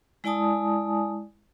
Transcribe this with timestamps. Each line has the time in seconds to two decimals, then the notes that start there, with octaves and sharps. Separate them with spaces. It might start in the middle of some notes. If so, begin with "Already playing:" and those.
0.24 G#3 E4 D5 G#5 A5 D#6